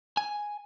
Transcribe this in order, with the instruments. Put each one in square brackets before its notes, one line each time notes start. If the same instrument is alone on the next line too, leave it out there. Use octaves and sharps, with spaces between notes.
[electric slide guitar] G#5